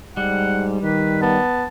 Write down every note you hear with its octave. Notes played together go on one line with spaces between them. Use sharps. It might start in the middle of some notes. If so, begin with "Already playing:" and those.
G#2 G3 F#5
D#3 B4
B3 A5